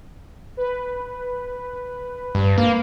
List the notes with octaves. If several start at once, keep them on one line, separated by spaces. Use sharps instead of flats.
B4
G2
A#3